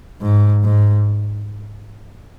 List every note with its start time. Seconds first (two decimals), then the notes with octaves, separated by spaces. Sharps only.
0.21 G#2
0.64 G#2